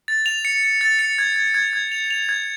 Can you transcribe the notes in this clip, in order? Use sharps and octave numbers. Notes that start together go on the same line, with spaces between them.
A6
F7
C#7
C#7
A6
C#7
G#6
G#6
G#6
G#6
F7
F7
G#6